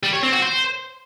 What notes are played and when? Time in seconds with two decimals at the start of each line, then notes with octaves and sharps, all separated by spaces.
0.03 G3
0.13 C#5
0.23 C4
0.33 F#4
0.43 C5